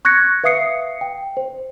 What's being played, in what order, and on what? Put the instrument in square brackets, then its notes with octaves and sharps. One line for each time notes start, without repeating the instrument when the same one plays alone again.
[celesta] C#6 F#6 G#6 A#6 C#7
B4 E5 F5 D#6 C7 C#7
G5
C5